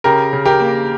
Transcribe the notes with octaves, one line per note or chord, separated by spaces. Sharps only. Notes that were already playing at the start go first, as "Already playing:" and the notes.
C#3 G4 A#4
C#3
G4 A#4
A#3